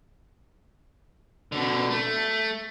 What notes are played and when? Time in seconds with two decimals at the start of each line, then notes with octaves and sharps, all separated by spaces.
1.52 B2 D3
1.91 A3